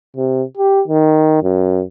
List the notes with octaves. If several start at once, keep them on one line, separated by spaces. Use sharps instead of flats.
C3
G4
D#3
F#2